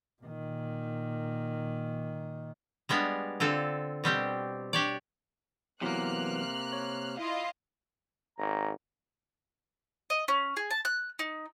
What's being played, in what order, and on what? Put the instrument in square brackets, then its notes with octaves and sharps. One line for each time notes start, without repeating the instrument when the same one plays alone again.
[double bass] A#2 D#3
[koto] G3 G#3 B3 D4 F5
D3 C4 F4 A4
B2 G3 C4 G4
D4 G4 C#5 D5
[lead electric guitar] C3 A#3 [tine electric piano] E3 F#3 B3 [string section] F6 F#6
[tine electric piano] C#5
[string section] E4 F4 D#5 [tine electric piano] F5
[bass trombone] G#1 [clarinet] A#5
[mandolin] D#5
C#4
G#4
A5
F#6
D#4